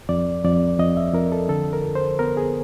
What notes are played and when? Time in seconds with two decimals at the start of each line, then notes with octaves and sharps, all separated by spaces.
0.09 F2 D5
0.44 F2 D5
0.79 F2 D#5
0.97 E5
1.14 F2 A#4
1.32 A4
1.49 D3 A4
1.73 A#4
1.84 F2
1.95 C5
2.19 B3 A#4
2.37 G#4